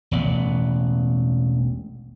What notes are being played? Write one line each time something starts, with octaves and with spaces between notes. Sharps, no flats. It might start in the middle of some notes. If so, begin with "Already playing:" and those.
E1 A1 B3